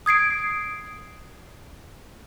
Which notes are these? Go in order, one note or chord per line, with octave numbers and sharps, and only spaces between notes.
D#6 G#6 C7 D7